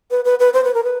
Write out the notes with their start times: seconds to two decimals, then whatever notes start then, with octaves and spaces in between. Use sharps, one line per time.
0.11 B4
0.25 B4
0.40 B4
0.53 C5
0.64 B4
0.74 A#4
0.84 B4